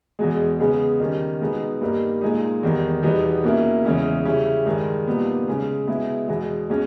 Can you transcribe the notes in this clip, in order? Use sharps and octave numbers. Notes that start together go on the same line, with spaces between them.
E2 B2 G#3
C#3 G#3 B3
D#3 G3 C#4
B2 G#3 B3 D#4
G2 G3 A#3 D#4
A#2 G#3 D#4
E2 D#3 G3
E2 B2 G3 B3 D#4
B2 A#3 C#4 E4
E2 C#3 G#3 C#4 E4
C#3 G3 C#4 E4
G2 D#3 G#3
A#2 G3 B3 D#4
C#3 G#3 C#4
B2 G#3 B3 E4
E2 B2 G#3
B2 G#3 C#4